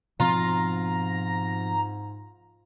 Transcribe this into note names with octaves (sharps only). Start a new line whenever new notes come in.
G#2 B2 F3 C4 F4 A#5